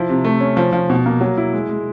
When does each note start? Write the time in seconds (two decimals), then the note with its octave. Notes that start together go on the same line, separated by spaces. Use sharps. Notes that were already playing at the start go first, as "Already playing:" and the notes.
Already playing: F3 E4
0.09 C3
0.25 A3
0.41 C#4
0.57 F3
0.73 F3
0.90 B2
1.06 A#3
1.21 F#3
1.37 E4
1.53 G#3
1.69 G#3